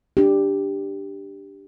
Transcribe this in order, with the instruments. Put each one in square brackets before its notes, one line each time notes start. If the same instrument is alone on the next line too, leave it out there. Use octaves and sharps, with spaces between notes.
[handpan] D4 G4